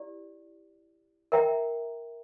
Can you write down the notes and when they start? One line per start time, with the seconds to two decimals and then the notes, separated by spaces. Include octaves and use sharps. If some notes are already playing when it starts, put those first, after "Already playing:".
Already playing: E4 G4 D5
1.32 A#4 E5 G5 A#5